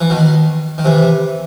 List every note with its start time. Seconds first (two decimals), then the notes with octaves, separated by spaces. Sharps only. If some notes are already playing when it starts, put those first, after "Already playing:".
0.01 E3
0.10 B2 D#3
0.78 D#3
0.85 C3 E3